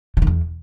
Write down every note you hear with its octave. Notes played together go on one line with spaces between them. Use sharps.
C#3
D#3
E2